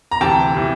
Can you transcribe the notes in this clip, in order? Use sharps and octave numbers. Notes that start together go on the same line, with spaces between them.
A#5
D2 C3 E3 G5 A5
C3 E3